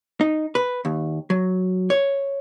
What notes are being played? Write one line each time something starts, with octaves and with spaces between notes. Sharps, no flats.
D#4
B4
D#2
F#3
C#5